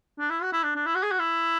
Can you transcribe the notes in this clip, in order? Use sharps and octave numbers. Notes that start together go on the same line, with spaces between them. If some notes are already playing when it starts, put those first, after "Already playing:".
D4
E4
F#4
E4
D4
D4
E4
F#4
G#4
F#4
E4